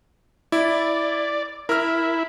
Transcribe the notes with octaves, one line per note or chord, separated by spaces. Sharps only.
E4 D5
E4 A#4 F6